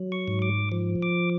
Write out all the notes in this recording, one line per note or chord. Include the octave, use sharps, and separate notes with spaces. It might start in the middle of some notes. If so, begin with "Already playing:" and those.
Already playing: F#3
C#6
G#2
D6
F3
D6